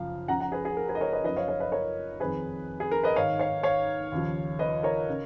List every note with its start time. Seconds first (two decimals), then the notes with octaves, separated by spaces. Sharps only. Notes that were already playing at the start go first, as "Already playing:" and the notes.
Already playing: F#2 C#3 F3 F5
0.28 C#2 C#3 F3 F#5 A#5
0.40 F#5 A#5
0.52 G#4 B4
0.65 G#4
0.77 A#4
0.88 G#4 B4
0.95 D#5
1.01 A#4 C#5
1.13 B4 D#5
1.24 F#2 F3 B4 D#5
1.36 C#5 F5
1.48 C#5 F5
1.60 B4 D#5
1.72 A#4 C#5
2.20 F2 D#3 G#4 B4
2.80 G#4
2.91 A#4
3.04 B4 D#5
3.16 G#2 D#3 C#5 F5
3.39 C#5 F5
3.63 C#5 F5
4.12 D#2 C#3 F3
4.59 B4 D#5
4.83 A#4 C#5
5.09 C#3